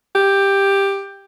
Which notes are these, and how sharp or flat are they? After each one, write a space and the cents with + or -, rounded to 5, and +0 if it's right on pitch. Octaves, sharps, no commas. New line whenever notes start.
G4 +10